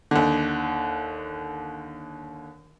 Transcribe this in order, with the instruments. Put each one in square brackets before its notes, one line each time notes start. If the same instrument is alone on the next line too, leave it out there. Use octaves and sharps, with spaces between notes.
[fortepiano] D#2 D3